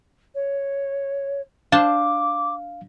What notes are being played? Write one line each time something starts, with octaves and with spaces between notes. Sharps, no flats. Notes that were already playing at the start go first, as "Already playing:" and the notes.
C#5
D4 C5 F5 A5 D6